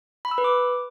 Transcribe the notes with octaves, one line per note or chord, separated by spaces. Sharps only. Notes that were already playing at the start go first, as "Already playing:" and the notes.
B5
E6
B4
D6